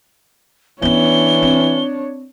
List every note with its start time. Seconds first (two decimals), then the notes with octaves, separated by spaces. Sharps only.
0.82 E3 B3 C#4 D4 C#5 G7
1.43 C4